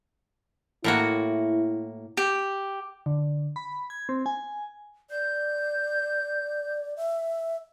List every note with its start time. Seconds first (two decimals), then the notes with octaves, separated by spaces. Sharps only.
0.84 A2 A#3 E4 F#4
2.17 G4
3.06 D3
3.56 B5
3.90 G#6
4.09 C4
4.26 G#5
5.10 D5 G6
6.97 E5